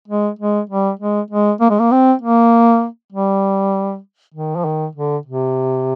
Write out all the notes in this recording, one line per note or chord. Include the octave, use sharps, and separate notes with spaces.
G#3
G#3
G3
G#3
G#3
A#3
G#3
A#3
C4
A#3
G3
D#3
F3
D#3
D3
C3